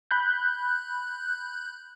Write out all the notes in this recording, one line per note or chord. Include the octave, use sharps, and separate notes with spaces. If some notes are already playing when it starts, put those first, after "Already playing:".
B5 F#6 G6